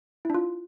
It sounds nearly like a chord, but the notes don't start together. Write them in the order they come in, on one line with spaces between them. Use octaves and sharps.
E4 D4 F4